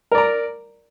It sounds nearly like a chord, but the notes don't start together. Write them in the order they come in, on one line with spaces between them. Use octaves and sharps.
A#4 D5 A#5